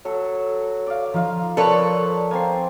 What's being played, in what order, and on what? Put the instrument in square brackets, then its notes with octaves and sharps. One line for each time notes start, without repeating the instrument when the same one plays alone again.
[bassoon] F#3 [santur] A4
[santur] D5 F5
[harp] F3 [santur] D#4 F4 F5
[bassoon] A#2 [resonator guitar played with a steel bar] A4 B4 C#5 [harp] D5 [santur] F5 C6
[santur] A#3 C4 [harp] G#5 A6 C7